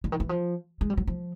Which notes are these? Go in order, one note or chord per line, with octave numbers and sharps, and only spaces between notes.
D3
D#3
E3
F3
G#3
G3
F#3
F3